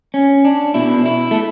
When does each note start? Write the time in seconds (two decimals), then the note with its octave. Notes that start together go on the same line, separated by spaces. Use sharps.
0.14 C#4
0.45 D4
0.74 B2 E4
1.06 E4
1.31 A3